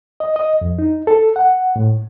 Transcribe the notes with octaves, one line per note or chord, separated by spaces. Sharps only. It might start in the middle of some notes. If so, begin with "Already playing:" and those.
D#5
D#5
F2
D#4
A4
F#5
A2